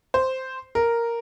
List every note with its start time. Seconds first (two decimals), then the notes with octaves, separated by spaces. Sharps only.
0.14 C5
0.75 A#4